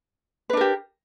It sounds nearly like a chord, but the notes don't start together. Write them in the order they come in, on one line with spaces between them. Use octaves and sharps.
B4 D4 A#4 G4